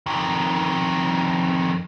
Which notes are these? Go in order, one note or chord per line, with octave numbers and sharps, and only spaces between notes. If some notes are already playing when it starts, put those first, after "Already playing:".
F2 D#3